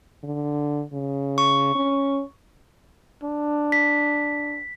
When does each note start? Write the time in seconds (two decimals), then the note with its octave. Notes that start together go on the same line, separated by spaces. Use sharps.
0.24 D3
0.93 C#3
1.38 C#6
1.75 C#4
3.23 D4
3.72 B6